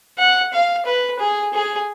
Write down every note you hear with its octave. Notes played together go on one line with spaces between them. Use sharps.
F#5
F5
B4
G#4
G#4